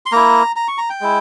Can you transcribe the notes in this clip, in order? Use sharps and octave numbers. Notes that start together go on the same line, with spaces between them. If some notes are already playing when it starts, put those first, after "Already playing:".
C6
A#3 E4 A#5
A#5
C#6
A#5
G5
G#3 E4